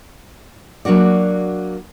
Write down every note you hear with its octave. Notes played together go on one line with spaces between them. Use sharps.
F#3 A#3 D4 F#4 D5